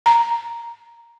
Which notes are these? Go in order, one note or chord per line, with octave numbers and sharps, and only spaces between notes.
A#5